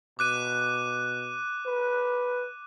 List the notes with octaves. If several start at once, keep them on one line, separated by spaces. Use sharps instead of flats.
B2 D6 F#6 D#7
B4